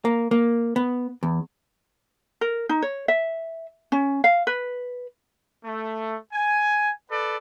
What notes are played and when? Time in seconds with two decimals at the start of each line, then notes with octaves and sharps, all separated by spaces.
0.05 A#3
0.31 A#3
0.76 B3
1.23 E2
2.41 A#4
2.69 D#4
2.82 C#5
3.08 E5
3.92 C#4
4.24 F5
4.47 B4
5.64 A3
6.33 G#5
7.09 A4 B4 D5